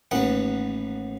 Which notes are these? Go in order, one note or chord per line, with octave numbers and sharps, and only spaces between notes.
A1 D#2 B3 F#5